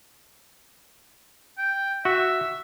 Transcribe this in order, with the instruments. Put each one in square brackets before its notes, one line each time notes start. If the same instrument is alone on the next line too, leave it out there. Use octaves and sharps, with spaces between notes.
[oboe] G5
[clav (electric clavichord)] F#4 [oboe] E5